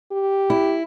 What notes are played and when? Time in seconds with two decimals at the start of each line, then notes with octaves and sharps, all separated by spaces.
0.12 G4
0.50 E4